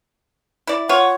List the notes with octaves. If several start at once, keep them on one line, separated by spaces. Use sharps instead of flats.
E4 D5
F4 C#5 F#5